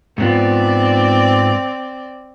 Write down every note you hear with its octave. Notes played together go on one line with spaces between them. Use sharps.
G#2 B3 C4 F4 D5